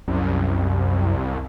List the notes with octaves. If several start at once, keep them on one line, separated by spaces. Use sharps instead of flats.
C2 F#2